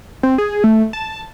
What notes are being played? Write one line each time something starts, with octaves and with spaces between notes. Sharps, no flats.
C4
G#4
A3
A5